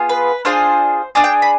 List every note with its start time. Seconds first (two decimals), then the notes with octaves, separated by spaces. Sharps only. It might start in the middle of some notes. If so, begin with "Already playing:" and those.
Already playing: B3 F4 G#4
0.09 B4
0.45 D4 F4 G#4 C5
1.15 D4 G#4 D5
1.24 G5
1.42 B5